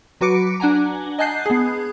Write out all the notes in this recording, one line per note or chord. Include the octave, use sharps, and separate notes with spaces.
F#3 F#4 B4 D6 C#7 D7
D4 F#5 G#5 A#5
D#5 G#5 A5 F#6 G6 C7
B3 G#4